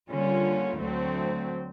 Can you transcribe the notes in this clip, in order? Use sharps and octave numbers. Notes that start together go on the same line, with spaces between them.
D3 G3 A#3 C#4 F4
D2 D3 F#3 A3 C4